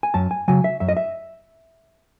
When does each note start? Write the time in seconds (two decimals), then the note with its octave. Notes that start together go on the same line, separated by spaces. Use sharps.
0.03 G#5
0.14 F#2 A5
0.31 G#5
0.48 C#3 F#3 G#5
0.64 E5
0.80 F#2 E5
0.89 D#5
0.97 E5